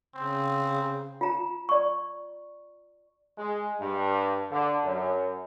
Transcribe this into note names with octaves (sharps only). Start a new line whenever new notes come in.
C#3 C4
F4 A#5
D5 C#6
G#3
G2
D3
F#2